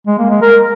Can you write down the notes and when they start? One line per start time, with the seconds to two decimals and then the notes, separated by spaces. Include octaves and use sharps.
0.07 G#3
0.19 A#3
0.30 G#3
0.42 A#4